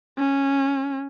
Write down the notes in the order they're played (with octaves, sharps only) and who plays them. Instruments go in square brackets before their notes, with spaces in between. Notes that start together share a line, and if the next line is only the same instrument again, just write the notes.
[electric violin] C#4